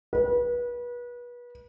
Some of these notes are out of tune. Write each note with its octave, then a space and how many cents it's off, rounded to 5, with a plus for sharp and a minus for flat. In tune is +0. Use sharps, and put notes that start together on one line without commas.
B4 -30